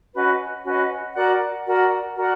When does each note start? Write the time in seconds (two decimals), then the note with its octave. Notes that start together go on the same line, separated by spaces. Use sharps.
0.14 C#4 F#4 B4 D#5
0.64 C#4 F#4 B4 D#5
1.14 F#4 A#4 D5 F#5
1.65 F#4 A#4 D5 F#5
2.16 F#4 A#4 D5 F#5